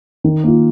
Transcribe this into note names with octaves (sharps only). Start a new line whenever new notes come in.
D#3
A#3 F4